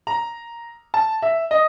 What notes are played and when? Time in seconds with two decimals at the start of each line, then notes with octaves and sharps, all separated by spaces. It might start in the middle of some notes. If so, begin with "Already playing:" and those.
0.07 A#5
0.94 A5
1.22 E5
1.51 D#5